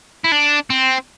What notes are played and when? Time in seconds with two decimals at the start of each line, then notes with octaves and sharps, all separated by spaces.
0.24 E4
0.32 D4
0.70 C4